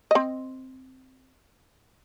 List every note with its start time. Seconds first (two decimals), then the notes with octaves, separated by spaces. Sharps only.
0.11 C4 D#5